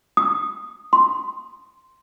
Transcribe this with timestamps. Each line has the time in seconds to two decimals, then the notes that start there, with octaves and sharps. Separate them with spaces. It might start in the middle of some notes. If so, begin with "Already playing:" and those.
0.17 D#6
0.93 C6